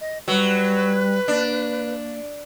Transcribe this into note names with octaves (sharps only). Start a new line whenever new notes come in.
D#5
F#3 G3 B4
A#3 D4